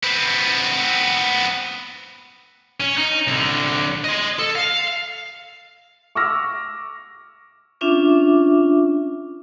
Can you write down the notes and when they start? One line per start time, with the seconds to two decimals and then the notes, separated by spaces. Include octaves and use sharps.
0.03 B3 C4
2.80 C#4
2.97 D#4
3.27 C2 D3
4.04 D#5 C6
4.39 A4
4.55 F5
6.15 C#6 D6 E6 F6 A#6
7.81 C#4 D4 F4 E5 D6